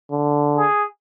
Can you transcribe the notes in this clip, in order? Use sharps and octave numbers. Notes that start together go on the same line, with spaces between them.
D3
G#4